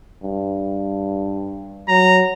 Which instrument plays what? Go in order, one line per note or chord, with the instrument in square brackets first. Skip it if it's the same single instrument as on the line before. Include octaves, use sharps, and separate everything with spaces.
[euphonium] G2
[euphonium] F#3 [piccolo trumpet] A#5